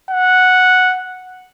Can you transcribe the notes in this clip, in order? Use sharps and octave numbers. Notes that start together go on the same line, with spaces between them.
F#5